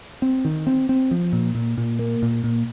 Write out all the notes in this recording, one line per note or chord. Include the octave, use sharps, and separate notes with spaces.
C4
D#3
C4
C4
F3
A#2
A#2
A#2
A#3
A#2
A#2